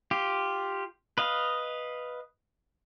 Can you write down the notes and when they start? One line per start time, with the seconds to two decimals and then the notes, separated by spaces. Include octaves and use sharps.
0.11 F4 G4
1.18 B4 D#5 F5